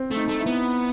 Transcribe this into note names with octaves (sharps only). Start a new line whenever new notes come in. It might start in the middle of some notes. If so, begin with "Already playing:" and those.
Already playing: C4
A3
D#4
A3
E4
B3